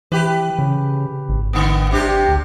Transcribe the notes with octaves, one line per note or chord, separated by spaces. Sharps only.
E3 G4 B4
C#3
G#1
D3 A#3 B3
C3 D4 G4
D2